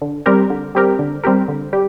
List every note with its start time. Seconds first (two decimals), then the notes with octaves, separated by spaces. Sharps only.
0.02 D3
0.26 G3 C4 G4 A#4
0.50 D3
0.75 G3 C4 G4 A#4
0.99 D3
1.24 G3 C4 G4 A#4
1.48 D3
1.73 G3 G4